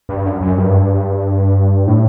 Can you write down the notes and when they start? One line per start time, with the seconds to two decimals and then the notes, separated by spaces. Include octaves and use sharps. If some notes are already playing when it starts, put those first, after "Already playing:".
0.09 G2
0.25 F#2
0.41 F#2
0.58 G2
1.87 A2